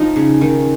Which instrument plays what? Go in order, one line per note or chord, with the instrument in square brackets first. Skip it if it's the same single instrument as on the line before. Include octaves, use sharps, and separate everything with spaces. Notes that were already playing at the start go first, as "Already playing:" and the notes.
Already playing: [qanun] F3 D#4
C#3
D#3